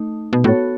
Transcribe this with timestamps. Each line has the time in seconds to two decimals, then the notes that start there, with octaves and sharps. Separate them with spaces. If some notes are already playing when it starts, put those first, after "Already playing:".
Already playing: A3 D#4
0.33 B2
0.44 A2 B3 F#4 A4 C#5